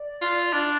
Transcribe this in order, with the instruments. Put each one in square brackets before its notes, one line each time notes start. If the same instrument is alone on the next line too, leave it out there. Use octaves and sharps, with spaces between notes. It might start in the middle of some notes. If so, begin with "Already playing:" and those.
Already playing: [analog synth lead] D5
[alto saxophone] F4
D4